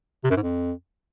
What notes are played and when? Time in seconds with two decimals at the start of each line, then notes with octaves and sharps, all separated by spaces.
0.24 C3
0.30 F#2
0.36 G#2
0.43 F2